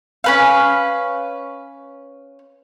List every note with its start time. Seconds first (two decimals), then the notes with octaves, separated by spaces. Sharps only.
0.24 C#4 B4 F5